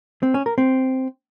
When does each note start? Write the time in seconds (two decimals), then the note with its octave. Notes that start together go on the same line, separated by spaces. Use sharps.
0.23 C4
0.34 C#4
0.46 A#4
0.58 C4